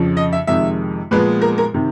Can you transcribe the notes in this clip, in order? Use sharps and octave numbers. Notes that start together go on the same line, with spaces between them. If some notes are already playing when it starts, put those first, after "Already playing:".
Already playing: F2 C#3 F3
D#5
E5
F2 C3 D#3 G#3 E5
A#2 F3 G#3 B3 B4
A#4
A#4
C3 D#3